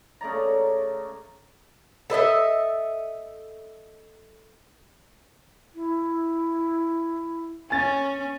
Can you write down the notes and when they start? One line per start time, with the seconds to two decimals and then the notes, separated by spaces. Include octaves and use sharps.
0.21 C#3 A3 D5 A#5
2.10 A4 B4 D#5 E5
5.75 E4
7.70 C#4 G#5 A6